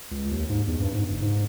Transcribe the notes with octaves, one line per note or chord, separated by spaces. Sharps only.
C#2
D#2
G#2
E2
G2
G#2
F#1
G#2